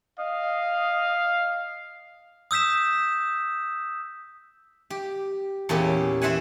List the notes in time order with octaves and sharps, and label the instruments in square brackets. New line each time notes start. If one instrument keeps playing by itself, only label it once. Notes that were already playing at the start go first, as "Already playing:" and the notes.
[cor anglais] D#5 [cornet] F5
[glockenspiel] D#6 E6 G6 B6 E7
[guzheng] G4
E2 A#2 C#4 G4
E3 C5 E5 F#5 G#5